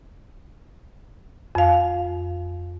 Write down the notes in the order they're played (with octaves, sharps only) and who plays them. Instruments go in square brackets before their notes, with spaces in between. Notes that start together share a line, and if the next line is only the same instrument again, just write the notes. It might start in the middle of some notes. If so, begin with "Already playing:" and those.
[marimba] F2 F5